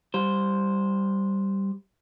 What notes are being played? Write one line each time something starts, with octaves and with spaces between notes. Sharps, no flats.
G3 C5